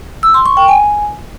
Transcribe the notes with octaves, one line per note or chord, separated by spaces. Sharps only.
E6
C6
C#6
G5
G#5